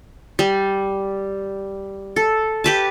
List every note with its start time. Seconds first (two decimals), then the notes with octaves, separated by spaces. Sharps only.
0.39 G3
2.16 A4
2.64 G4 B4 A5